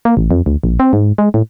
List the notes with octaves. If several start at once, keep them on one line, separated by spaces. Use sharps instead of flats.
A#3
A1
F2
D2
A#1
C4
G#2
G#3
A2